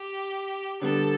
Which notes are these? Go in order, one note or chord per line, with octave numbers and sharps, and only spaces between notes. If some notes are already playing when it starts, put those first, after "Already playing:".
Already playing: G4
D3 G3 B3 A4